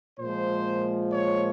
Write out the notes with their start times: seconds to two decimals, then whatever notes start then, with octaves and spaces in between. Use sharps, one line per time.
0.19 A#2 F3 G#3 C5
1.12 C#5